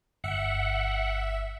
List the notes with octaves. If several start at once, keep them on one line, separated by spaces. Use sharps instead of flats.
G1 E5 F#5